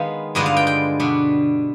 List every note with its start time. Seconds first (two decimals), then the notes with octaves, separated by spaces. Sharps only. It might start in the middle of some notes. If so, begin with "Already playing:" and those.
Already playing: D#3 G#3 B3 D#4 F5
0.35 G2 D3 G#3 B3 F4 D#5
0.46 F5
0.57 G5
0.67 G5
1.00 B2 B3 D4